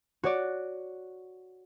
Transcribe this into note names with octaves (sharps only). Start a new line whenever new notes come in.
F#4 C#5 D5